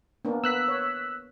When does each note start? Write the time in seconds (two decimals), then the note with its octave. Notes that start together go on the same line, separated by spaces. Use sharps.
0.25 A#3 B3 D4
0.44 B3 E6 F#6 B6
0.68 C#5